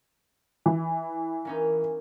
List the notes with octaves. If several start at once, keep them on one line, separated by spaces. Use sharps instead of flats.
E3
A#3 C#4 D#4